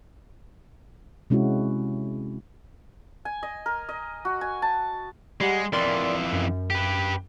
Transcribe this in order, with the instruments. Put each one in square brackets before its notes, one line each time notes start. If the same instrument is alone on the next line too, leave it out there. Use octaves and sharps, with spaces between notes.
[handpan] C3 G#3 C#4 E4 F#4
[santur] G#5
D#5
A#4
D#5
F#4
G#5
A5
[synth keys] G3 G4 F#5 [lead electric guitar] G#3
[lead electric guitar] F2 E3 [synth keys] A#4 D5 C6
[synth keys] F#2
[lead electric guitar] G4 B4